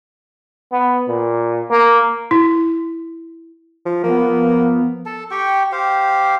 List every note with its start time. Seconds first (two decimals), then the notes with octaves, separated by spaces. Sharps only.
0.72 B3
1.08 A#2
1.71 A#3
2.31 E4
3.86 F3
4.04 F3 A#3 B3
5.06 A4 A5
5.31 G4 G5 C#6
5.72 G4 C5 F5